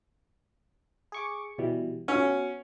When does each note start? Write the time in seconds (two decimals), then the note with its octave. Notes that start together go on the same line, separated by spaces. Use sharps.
1.12 G#4 C#6 D6
1.58 B2 E3 G3
2.08 B3 C#4 F#4